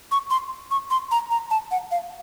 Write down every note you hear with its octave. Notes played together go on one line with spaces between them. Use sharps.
C#6
C6
C#6
C6
A#5
A#5
A5
F#5
F5